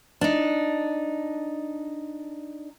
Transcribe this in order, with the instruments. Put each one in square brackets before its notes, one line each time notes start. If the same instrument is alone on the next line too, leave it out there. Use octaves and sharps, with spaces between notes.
[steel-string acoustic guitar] D4 D#4